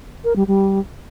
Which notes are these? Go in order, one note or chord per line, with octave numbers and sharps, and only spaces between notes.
A#4
G3
G3